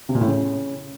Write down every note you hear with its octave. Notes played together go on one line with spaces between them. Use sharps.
C3
A#2
A2
C#3